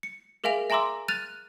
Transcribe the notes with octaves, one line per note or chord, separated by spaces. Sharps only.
C#7
G#4 A#4 E5 F5 G#5 F7
E5 G#5 A#5 C6 D6 E6
F6 F#6 A6 D#7 F7